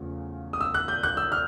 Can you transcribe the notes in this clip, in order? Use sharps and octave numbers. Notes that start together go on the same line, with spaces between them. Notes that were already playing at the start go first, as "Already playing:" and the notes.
Already playing: E2 C#3 F3 A3 C#4
D#6
E6
F#6
G6
F#6
E6
F6